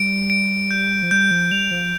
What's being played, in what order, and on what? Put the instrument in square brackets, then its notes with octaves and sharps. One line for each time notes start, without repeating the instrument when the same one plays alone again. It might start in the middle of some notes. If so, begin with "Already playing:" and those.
Already playing: [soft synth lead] G3 [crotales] D7
[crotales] D7
G6
[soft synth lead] F3
[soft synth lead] G3 [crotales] G6
[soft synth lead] F3
[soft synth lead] G3 [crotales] F7
[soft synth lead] F3